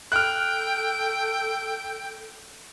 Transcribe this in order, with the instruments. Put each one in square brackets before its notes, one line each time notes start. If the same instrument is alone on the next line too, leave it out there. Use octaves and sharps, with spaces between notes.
[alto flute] A4 [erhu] G5 [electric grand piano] F6 F#6